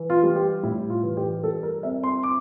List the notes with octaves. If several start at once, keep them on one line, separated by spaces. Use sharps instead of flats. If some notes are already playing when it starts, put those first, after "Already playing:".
Already playing: E3
F4
G3
G4
A2 E4
F4
E3
G4
G3 A4
A#4
C4 E5
C6
D6